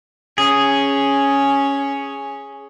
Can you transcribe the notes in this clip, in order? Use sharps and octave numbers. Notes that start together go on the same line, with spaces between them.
C#4 G#4